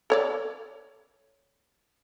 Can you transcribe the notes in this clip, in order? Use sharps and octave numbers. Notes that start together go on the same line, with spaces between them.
A4 C#5 D5